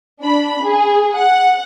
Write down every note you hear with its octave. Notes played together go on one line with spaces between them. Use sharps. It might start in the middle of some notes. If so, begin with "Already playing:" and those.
D4 B5
G#4
F#5